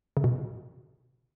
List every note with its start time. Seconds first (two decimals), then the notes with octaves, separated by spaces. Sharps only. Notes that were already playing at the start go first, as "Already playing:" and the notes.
0.17 C#3
0.24 B2